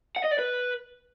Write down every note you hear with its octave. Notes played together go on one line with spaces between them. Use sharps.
F#5
D#5
D5
B4